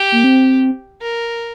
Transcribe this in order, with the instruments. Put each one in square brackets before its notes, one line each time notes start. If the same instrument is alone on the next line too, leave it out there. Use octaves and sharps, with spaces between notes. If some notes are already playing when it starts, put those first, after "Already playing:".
Already playing: [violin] G4
[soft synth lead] A#3
C4
[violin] A#4